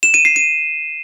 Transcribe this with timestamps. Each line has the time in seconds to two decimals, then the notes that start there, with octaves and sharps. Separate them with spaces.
0.03 E7
0.14 D#7
0.25 C7
0.36 D#7